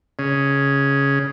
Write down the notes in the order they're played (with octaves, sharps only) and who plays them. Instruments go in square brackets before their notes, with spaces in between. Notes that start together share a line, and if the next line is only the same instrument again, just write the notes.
[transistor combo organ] C#3